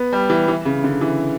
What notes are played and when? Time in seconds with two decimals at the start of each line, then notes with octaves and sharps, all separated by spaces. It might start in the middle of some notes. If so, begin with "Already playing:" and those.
Already playing: B3
0.13 G3
0.30 E3
0.48 E3
0.65 C#3
0.84 D3
1.01 E3